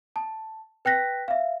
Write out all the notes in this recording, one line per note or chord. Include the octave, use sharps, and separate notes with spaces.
A5
B4 G5 F#6 A#6 B6
E5 F5